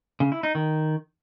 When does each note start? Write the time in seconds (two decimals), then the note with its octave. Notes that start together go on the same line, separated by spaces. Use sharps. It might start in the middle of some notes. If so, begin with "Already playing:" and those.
0.20 C#3
0.32 E4
0.43 D#4
0.55 D#3